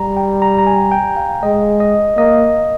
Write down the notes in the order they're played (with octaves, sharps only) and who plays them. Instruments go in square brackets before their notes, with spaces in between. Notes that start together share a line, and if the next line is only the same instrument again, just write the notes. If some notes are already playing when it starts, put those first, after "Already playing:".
Already playing: [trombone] G3 [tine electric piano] A#5
[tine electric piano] G5
A#5
A#5
G#5
G5
F5
[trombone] G#3 [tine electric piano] D#5
[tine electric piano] D#5
[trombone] A#3 [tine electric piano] D#5